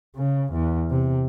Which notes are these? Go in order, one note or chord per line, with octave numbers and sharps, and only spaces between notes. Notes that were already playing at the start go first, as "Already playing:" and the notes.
C#3
E2
C3